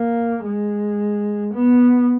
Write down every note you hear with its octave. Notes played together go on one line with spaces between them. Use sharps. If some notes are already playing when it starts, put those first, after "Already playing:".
Already playing: A#3
G#3
B3